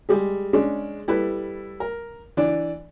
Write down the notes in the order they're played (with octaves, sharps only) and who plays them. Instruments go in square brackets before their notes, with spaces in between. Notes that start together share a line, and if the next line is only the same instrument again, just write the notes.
[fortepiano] G3 G#3 G#4
G#3 C#4 D4
G3 E4 A4 B4
A#4
E3 D4 D5